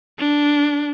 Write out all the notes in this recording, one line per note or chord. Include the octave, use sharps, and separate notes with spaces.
D4